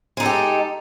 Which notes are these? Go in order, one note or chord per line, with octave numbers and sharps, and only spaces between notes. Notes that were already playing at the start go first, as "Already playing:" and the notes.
G#3 D#4 G4 A4